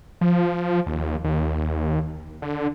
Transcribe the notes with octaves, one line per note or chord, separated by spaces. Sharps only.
F3
D#2
D#2
D3